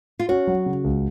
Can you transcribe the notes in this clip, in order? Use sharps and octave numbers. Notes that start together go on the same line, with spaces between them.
F4
C#4 F#4
F#3
C#3
C#2